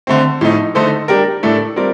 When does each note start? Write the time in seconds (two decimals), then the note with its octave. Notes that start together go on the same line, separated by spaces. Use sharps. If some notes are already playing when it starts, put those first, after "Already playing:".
0.07 D3 A3 C4
0.41 A2 F3 A3 D#4
0.75 D3 A3 D#4 A4 C5
1.08 G3 D4 G4 A#4
1.43 A2 A3 D4 A4
1.76 G3 C4 F4 A#4 D5